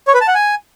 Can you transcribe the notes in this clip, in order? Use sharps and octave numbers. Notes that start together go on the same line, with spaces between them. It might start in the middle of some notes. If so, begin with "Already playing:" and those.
C#5
B4
A5
F#5
G#5